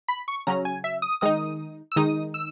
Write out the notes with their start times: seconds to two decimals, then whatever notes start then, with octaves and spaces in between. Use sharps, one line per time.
0.08 B5
0.28 C#6
0.47 C#3 F#3 C#4 A#5
0.65 G#5
0.84 E5
1.02 D#6
1.21 D#3 G#3 D#4 D#6
1.92 E6
1.96 D#3 G#3 D#4 D#6
2.34 E6